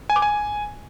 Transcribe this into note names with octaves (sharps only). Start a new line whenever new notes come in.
G#5
D6
G#5